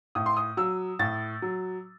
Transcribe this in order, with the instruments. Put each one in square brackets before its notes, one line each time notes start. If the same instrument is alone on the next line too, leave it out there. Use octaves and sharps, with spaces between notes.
[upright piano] A2 D#6
C6
D#6
F#3 E6
A2 A6
F#3